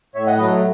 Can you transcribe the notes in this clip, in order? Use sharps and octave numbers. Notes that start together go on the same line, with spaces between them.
A2 C#5 E5
D#5 F#5
F#3 A3 B4 D#5